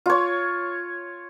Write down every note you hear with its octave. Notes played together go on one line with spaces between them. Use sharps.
F4 C#5